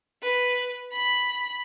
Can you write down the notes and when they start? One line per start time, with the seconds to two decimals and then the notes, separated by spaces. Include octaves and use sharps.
0.23 B4
0.92 B5